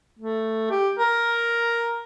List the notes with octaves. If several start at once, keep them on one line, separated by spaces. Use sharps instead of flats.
A3
G4
A#4